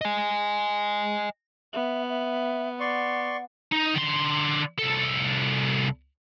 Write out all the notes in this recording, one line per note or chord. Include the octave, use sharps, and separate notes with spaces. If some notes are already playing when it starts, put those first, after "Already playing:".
D#5 G#5
B3 E5
E5
D5 F#5 C6 C#6
D#4
D3 C6
C2 A4